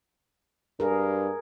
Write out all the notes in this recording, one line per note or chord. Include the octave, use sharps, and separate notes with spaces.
G2 G#4 A#4